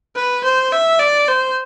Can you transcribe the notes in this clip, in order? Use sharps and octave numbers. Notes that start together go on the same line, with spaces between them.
B4
C5
E5
D5
C5